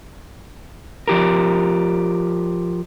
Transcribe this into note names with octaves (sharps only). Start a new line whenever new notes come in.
F3 G4 A#4